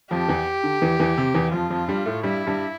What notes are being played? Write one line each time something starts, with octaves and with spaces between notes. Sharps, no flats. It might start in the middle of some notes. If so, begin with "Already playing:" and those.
F2 F3 G4
E2 E3
D3
E2 E3
E2 E3
C3
E2 E3
F2 F3 F4
F2 F3
G2 G3
A2 A3
G2 G3 E4
G2 G3